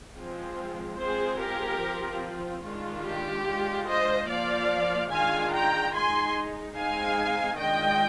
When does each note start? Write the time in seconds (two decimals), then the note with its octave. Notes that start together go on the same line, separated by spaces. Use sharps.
0.16 F3 G#3 C4 F4
0.98 G#3 C4 F4 G#4 C5
1.39 G4 A#4
1.81 F3 C4 F4
2.63 D#3 G#3 D4 F4
3.05 G4
3.46 G#3 D4 F4
3.87 C5 D#5
4.28 F3 A#3 F4 D5 F5
5.10 D#3 G#3 D4 F4 F5 G#5
5.52 G5 A#5
5.93 G#3 D#4 G#5 C6
6.75 G#3 C4 D#4 F5 G#5
7.58 D#3 G#3 D4 F4 D#5 G5